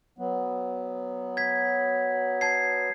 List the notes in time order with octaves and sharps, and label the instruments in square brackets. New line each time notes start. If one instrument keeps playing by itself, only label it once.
[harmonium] F#3 B3
[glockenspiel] G#6 B6
A5 G#6 C7